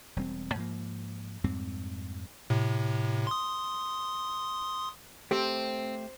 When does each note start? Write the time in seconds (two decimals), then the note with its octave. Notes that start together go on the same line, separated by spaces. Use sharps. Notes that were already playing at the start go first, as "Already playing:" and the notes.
0.16 E1 G3 C4
0.55 G#2 F3 A#3
1.44 F2 G#2 G3 C4
2.50 A2 C3
3.27 C6 D#6
5.31 A3 C4 G4